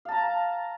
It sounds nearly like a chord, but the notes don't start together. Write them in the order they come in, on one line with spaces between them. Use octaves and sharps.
F5 A5 A#5